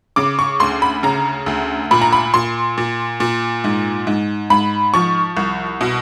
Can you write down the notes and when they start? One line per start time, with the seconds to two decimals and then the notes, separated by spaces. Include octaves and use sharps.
0.16 C#3 D6
0.39 C#6
0.60 D2 C6
0.82 B5
1.03 C#3 A#5
1.46 D2
1.91 A#2 B5
2.02 A#5
2.13 B5
2.34 A#2 C6
2.78 A#2
3.20 A#2
3.64 G#2
4.07 G#2
4.50 G#2 B5
4.94 F3 C#6
5.37 C2
5.81 B2